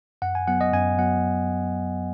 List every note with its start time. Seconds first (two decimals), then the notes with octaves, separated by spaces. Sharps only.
0.22 F#2 F#5
0.35 G#5
0.48 F#3 B3 F#5
0.61 D#5
0.73 F#2 G#5
0.98 F#3 B3 F#5